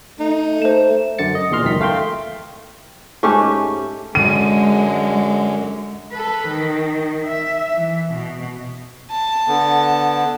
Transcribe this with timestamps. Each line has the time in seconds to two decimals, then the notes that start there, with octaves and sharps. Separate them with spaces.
0.20 A3 D#4
0.62 A3 C5 E7
1.19 F#2 D3 A6 C#7
1.35 D#5
1.51 E2 A#2 D#5 C6 F6
1.63 C#2 F#2 D#3 B6
1.80 A3 F5 G5 C6
3.23 G#2 A3 C#4 G4
4.15 F#2 D3 G#3 D#7
6.12 A4 B4
6.48 D#3
7.27 E5
7.74 E3
8.12 B2
9.11 A5
9.47 D3 B3